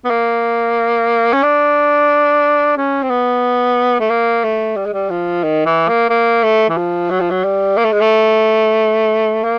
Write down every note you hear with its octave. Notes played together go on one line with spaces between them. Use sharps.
B3
A#3
C#4
D4
C#4
C4
B3
A3
A#3
A3
G3
G#3
G3
F3
D#3
E3
A#3
A#3
A3
E3
F3
F#3
F3
F#3
G3
A#3
A3
G#3
A3
A#3